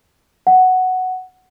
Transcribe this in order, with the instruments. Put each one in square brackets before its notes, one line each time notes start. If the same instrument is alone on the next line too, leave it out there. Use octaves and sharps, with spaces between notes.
[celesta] F#5